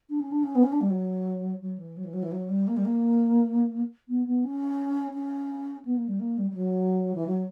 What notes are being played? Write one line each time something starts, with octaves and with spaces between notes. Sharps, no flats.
D4
C#4
D4
C#4
B3
C#4
D4
G3
F#3
F#3
E3
F#3
E3
F#3
E3
F#3
G3
A#3
G3
A#3
B3
B3
C#4
C#4
B3
A#3
G3
A#3
G3
G3
F#3
E3
F#3